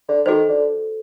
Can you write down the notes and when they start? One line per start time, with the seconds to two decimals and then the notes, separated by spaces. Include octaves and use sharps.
0.09 D3
0.26 D#3 F#4 A4 C5
0.49 D3